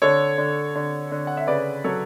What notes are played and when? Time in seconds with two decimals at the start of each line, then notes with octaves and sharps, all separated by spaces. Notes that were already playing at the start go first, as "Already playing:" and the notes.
0.02 D3 A4 C#5
0.38 D3
0.75 D3
1.12 D3
1.27 F#5
1.37 E5
1.47 C#3 B4 D5
1.84 F#3 A4 C#5